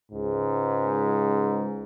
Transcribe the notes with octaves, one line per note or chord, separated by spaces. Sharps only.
C#2 G#2